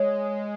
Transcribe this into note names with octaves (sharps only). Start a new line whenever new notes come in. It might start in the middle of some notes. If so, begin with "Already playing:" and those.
Already playing: G#3 C#5